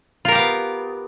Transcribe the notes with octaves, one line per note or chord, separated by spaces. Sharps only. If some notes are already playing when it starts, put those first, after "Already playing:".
B3 F4 G4 A#4 F5